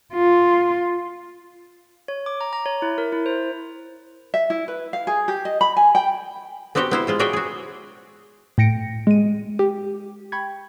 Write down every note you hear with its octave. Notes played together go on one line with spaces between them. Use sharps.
F4
C#5
D6
A#5
A#5
C#5
E4
A#4
E4
C5
E5
E4
B4
F5
G#4
G4
D#5
B5
G#5
G5
B3 C4 F#4 G4 G5
B3 E4 C5
G#3 F4 C5
F#4 G#4 C#5 D5 E5 G5
F#4 G#4
A2 G5 A#6 C#7 D7
G#3 D#7
G4
G5 B5 C#6 G#6